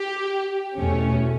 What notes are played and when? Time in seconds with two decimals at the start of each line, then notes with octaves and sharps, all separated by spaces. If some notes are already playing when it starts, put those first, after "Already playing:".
Already playing: G4
0.78 E2 B2 A3 C#4